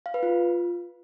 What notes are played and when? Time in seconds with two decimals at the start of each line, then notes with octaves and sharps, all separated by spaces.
0.06 F5
0.14 B4
0.23 F4